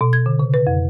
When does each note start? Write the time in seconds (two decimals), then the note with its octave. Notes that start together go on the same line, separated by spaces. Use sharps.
0.01 B2
0.13 G#6
0.26 D3
0.39 C#3
0.54 B4
0.67 F2